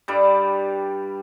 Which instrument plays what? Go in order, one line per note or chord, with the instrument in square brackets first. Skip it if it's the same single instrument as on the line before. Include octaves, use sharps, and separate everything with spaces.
[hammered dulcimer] G2 G3 D5